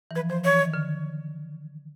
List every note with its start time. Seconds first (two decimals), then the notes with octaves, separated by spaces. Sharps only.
0.11 E3
0.16 F3 B4
0.30 F3 C5
0.44 E3 C#5
0.59 D#3
0.74 D3